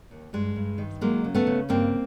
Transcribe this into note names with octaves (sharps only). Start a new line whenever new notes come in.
D#2
G2 G#3
G2
D#3
F#3 G#3 A#3
C#3
A3 B3
C#3
G2 A#3 C4